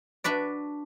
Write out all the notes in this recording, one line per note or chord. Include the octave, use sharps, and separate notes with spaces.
D4 F#4 B4 D5